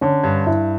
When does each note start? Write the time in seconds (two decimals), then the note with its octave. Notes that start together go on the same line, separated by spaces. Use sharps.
0.01 D3 C#4
0.24 G2
0.46 G2 E4